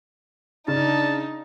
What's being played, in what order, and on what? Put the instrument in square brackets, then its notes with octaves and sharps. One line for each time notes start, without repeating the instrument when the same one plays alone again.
[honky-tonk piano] C#3 [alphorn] D4 [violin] D#4 [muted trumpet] A5